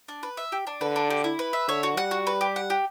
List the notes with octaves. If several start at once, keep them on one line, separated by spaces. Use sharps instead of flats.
D4
B4
E5
G4
D4
D3 B4
D4
G4
E4
B4
E5
D3 C#5
F#4
G3 F#5
F#4
B4
G4
F#5
G4